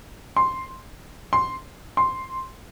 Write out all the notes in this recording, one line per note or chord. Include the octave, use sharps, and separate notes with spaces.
C6
C6
C6